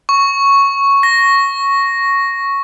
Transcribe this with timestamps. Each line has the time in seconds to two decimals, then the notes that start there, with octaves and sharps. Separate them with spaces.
0.09 C#6
1.03 A#6